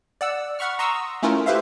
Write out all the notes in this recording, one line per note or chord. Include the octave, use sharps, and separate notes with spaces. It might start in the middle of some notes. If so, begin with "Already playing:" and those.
D5 F#5 E6
F#5 B5 C#6 F6
A#5 C6 C#6 D#6 E6
A3 C#4 E4 F4 A#4
E4 G4 B4 C5 E5 F5